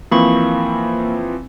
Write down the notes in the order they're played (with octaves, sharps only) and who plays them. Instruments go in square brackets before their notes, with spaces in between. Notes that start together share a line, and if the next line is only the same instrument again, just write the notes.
[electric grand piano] E3 F3 C4 [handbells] A#3 B5 C#6